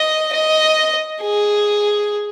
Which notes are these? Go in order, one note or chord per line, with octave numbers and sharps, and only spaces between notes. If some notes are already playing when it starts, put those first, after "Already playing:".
Already playing: D#5
D#5
G#4